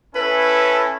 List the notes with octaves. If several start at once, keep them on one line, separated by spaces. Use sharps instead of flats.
C#4 E4 A4 B4